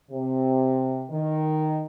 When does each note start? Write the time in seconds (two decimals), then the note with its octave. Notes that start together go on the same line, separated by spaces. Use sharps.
0.10 C3
1.11 D#3